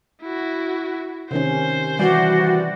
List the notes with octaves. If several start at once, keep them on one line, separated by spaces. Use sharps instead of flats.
E4 F#4
C3 D#3 C#4 C5
E3 G3 F#4 D5